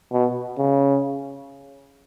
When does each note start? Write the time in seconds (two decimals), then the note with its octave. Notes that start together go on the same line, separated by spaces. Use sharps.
0.12 B2
0.58 C#3